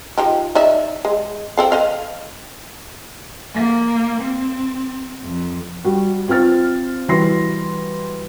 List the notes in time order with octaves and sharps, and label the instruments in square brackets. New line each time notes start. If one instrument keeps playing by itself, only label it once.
[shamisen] F3 D#4 G4
D#4 D5 E5
G#3
C4 A4 F5
B4 D#5 F5
[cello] A#3
C4
F2
[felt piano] G3 F#4
C4 F4 C5 F6 A6
E3 G3 F#4 C6 A#6 C7